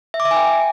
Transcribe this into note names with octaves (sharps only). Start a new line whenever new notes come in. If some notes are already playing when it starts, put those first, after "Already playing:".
E5
D6
E5
G#5
G5